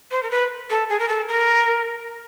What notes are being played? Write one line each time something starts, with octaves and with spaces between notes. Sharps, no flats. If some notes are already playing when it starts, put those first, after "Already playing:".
C5
A#4
B4
A4
G#4
A#4
A4
A#4